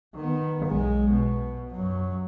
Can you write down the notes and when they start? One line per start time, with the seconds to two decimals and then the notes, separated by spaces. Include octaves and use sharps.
0.16 D#3 B3
0.66 B1 G#3
1.11 B2
1.72 F#2 F#3